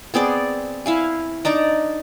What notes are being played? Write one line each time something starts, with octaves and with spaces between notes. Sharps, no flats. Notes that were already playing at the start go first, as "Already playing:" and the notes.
B3 C4 G#4 D5
E4 F5 G#5
D4 D#4 D5 A#5